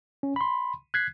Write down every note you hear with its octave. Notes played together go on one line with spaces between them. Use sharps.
C#4
B5 C6
F#6 G#6 B6 C7